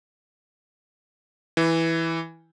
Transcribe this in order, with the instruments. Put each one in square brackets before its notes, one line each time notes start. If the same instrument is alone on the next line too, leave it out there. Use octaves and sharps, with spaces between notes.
[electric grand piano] E3